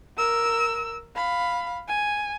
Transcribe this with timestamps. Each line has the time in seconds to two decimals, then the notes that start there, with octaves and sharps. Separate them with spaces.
0.18 A#4 E6
1.16 F5 B5
1.88 G#5